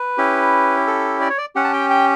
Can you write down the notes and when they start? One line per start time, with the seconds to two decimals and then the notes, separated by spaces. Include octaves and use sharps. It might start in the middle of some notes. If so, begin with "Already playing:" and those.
Already playing: B4
0.18 C#4 E4 G4
0.87 A4
1.21 D5
1.30 C#5
1.38 D5
1.55 C#4 G4 F#5
1.64 A5
1.73 G5
1.90 G5